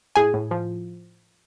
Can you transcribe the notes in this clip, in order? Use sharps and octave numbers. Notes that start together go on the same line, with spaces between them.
A2 G#4 G#5
A2
F3